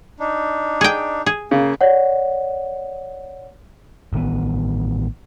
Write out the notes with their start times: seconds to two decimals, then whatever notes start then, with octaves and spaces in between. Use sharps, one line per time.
0.20 D4 D#4
0.81 G#4 G5
1.26 G#4
1.51 C#3 A#3
1.81 C#5 D5 F#5
4.13 A1 D#3 A#3 B3